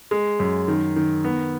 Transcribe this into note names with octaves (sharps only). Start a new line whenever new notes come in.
G#3
F#2
D#3
D#3
B3